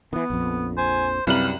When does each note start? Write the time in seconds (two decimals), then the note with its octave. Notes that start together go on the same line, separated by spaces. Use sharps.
0.13 D#3 E3 B3
0.30 A#1 F2
0.77 C5 G#5
1.27 C2 F#2 G3 B4 F5 F#7